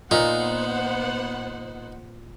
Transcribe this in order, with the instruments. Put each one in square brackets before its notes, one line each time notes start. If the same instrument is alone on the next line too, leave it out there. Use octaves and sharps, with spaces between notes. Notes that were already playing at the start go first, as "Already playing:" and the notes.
[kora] A#2 [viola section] B3 C5 F#5 [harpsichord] D#4